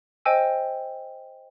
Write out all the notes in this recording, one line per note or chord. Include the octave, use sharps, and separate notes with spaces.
C5 D#5 G5 G#5 E6